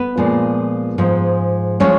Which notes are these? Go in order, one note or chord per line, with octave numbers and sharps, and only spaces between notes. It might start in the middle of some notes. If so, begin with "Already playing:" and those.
Already playing: B3 B4
A#2 F3 G#3
G#2 F3 G#3
F3 G#3 C#4 C#5